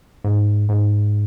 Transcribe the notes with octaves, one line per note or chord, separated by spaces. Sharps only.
G#2
G#2